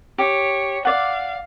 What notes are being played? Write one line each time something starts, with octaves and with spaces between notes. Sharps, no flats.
G4 C#5
D5 F5 F#5